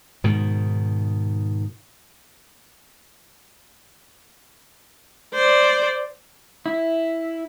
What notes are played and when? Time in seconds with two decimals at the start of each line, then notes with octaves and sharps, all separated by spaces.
0.24 G#2 B2 D#3
5.34 C5 D5
6.66 E4